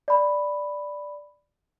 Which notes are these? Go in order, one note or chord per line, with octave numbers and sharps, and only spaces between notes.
D5 B5